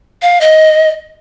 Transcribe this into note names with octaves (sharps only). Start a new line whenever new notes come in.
F5
D#5